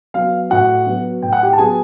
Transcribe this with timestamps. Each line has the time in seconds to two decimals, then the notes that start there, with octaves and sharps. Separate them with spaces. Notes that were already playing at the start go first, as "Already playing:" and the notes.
0.14 F#3 B3 F5
0.50 A2 F#4 F#5
0.86 F#3 B3
1.22 A2 G5
1.33 F#5
1.42 G4 G5
1.53 A5
1.58 F#3 B3 G#4 G#5